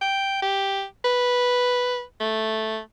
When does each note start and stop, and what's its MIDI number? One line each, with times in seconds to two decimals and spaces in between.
0.01 0.41 79
0.42 0.84 67
1.05 2.02 71
2.20 2.79 57